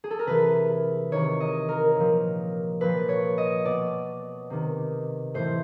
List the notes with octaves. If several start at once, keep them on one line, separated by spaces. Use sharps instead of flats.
G#4
A4
A#4
C3 E3 B4
C3 D#3 C#5
D#5
A#4
A#2 F3
A#2 F3 B4
C#5
D#5
B2 D5
C3 D#3
A2 E3 C5